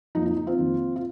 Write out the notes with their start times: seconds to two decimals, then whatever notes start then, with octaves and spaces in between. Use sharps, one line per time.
0.15 F2 F3 A#3 D#4
0.26 D#4
0.37 D#4
0.47 C4 F4
0.58 F2 D#3 A#3
0.96 F4